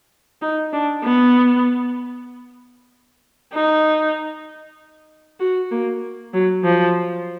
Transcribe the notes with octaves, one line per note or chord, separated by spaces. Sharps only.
D#4
D4
B3
D#4
F#4
A#3
F#3
F3